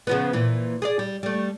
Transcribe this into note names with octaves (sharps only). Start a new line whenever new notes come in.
C#3 F3 B3
A#2 E3
G#4 C5 D5
G3
G3 A3